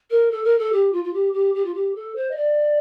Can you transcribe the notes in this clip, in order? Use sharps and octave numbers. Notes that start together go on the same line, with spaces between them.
A#4
A4
A#4
A4
G4
F4
F4
G4
G4
G4
F4
G4
A4
C5
D#5
D5